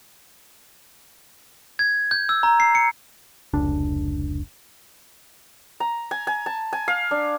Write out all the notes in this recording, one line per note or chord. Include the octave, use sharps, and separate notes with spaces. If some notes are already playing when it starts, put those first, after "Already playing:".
G#6
G6
E6
A#5
C7
C#7
F1 C#2 D4
A#5
G#5
G#5
A5
G#5
F5
D4